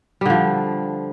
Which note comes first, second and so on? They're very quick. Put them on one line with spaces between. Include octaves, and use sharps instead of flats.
G3 D3 F3